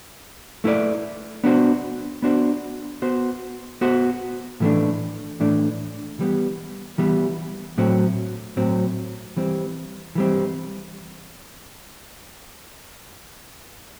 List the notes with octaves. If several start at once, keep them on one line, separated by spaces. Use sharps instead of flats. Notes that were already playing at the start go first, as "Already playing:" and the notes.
A3 E4 B4 D5
B3 D4 F#4 C5
B3 D4 F#4 C5
B3 F#4 C5
B3 F#4 C5
A2 E3 A3 D4
A2 E3 A3 D4
E3 G3 B3
E3 G3 B3
A2 F#3 C4
A2 F#3 C4
E3 G3 C4
E3 G3 C4